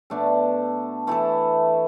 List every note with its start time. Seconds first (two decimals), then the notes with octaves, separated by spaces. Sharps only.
0.10 B2 A3 D4 A4
1.07 E3 A3 E4 A4